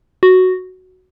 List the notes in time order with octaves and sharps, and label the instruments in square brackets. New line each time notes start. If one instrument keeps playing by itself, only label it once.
[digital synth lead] F#4